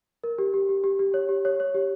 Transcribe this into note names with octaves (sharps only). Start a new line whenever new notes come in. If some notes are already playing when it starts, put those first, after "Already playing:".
A#4
G4
G4
G4
G4
G4
C#5
G4
C#5
C#5
G4